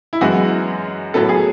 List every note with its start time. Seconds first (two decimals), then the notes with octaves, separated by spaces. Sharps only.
0.13 E4
0.21 F#2 E3 G#3 B3 F#4
1.14 A2 F#3 B3 A4
1.29 G#4